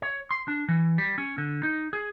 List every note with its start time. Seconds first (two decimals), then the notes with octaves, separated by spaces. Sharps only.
0.02 C#5
0.31 C6
0.48 D4
0.68 E3
0.98 G3
1.18 C#4
1.38 D3
1.63 D#4
1.93 G#4